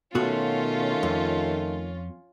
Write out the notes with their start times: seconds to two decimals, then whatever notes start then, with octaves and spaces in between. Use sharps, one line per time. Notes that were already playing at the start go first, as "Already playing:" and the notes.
0.15 B2 D#3 A3 C#4 F4 F#4
1.03 F2